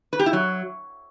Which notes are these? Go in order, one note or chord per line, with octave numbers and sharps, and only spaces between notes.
B4
G4
E4
F#3